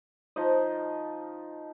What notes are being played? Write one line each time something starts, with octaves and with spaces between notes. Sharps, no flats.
F3 D#4 D#5